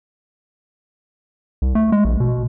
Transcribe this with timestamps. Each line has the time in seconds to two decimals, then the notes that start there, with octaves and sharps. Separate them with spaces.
1.62 C2
1.75 A3
1.92 G#3
2.05 A#1
2.20 B2